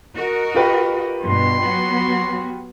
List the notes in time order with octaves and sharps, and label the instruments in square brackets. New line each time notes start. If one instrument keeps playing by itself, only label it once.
[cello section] F#4 A#4 D#5
[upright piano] F4 G4 B4
[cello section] G2 B2 [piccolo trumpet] C6
[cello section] F#3 B3 F#4